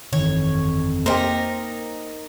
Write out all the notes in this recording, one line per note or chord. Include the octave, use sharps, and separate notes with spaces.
G1 F2 D#3 E3 C#5
A#3 D#4 G4 A#4 C5